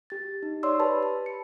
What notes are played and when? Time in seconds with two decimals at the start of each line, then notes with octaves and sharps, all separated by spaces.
0.10 G4 A6
0.43 D#4
0.63 C#5 D5 C6 E6
0.80 G4 B4 A5 B5
1.03 A5
1.26 C#7